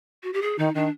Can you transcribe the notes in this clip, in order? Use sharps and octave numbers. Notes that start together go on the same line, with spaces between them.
F#4
G4
G#4
D#3 D#4
D#3 D4